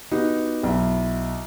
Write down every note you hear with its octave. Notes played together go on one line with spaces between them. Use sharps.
B3 D#4 F#4 G4
B1 E4